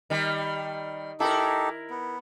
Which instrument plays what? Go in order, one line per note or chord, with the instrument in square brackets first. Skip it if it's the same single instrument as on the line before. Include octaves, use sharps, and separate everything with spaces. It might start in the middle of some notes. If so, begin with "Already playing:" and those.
[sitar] D#3 G3
[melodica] D#4 G4 A4 [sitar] E4 A#4
[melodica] B3